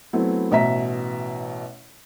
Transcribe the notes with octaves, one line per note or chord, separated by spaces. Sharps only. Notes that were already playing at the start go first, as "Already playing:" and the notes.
F#3 A3 B3 C4 E4
A1 B2 E5 A#5 B6